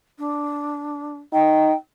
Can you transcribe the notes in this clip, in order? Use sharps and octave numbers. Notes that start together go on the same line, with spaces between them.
D4
D#4 G5